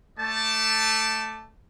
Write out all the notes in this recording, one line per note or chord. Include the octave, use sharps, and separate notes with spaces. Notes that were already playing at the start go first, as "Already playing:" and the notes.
A3 D5 A5